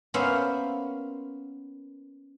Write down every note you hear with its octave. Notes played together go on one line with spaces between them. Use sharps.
A#3 B3 C#4 C5 E5 F5